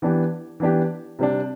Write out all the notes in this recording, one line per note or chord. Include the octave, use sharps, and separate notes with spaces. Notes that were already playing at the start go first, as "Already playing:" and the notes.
E3 B3 D4 G4
E3 B3 D4 G4
C3 G3 D4